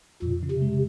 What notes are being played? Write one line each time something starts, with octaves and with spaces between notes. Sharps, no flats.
F2 A#2
C#3
C3
G#3